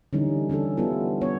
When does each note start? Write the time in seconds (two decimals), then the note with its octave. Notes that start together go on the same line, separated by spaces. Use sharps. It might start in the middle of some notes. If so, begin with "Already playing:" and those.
0.13 D3 E3 G3 C#4 D#4
0.49 D3 C#4 D4 A4
0.77 G3 B3 E4 F4 A4
1.21 B3 C#5